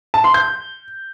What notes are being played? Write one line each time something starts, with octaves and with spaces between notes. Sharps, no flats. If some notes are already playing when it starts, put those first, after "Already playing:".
A5
C6
G6